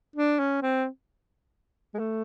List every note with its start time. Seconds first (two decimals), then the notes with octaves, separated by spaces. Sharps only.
0.16 D4
0.39 C#4
0.62 C4
1.94 G#3
1.99 A3